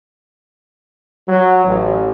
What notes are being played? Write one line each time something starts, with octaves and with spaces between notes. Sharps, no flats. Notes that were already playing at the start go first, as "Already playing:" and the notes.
F#3
A1